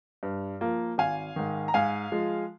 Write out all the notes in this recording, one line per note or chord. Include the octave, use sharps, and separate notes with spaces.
G2
F3 A#3
G#1 F5 G#5
G#2 D#3
A#5
G#2 F5 G#5
F3 G#3